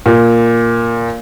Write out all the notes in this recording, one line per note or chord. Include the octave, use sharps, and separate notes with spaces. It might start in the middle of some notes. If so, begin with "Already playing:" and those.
A#2